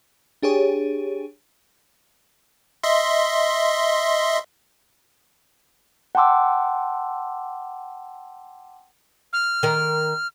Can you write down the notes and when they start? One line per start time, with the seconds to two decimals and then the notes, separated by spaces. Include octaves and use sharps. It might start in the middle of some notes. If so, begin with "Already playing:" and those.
0.43 D4 G4 G#4 C#5
2.83 D#5 E5 C6
6.15 F#5 G5 A5 C6 D6 E6
9.33 F6
9.63 D#3 A#4